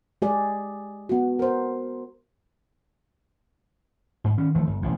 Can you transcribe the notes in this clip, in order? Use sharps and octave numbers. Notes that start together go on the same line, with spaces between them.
G#3 G4 G#4 D5
B3 F#4
A#4 C5
G#2
D#3 C#4
D#3 F3 A3
G1
E1 A1 F2